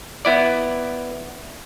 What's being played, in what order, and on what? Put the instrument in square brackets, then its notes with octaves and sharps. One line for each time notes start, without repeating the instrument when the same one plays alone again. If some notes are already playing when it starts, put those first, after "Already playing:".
[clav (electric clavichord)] B3 E4 D5